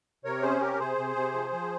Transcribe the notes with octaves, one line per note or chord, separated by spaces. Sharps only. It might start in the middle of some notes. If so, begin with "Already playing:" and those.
C3 A#4 C#5
C#4 G#4 C5
C3 G4 A#4
C3 G#4 C5
C3
C3
F3
F3